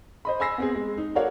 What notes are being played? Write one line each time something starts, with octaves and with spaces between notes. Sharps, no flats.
C5 D#5 B5
G#5 B5 E6 A#6 C7
B3 C4 G#4
G#3
D#4
F#4 A4 A#4 C#5 D5 F5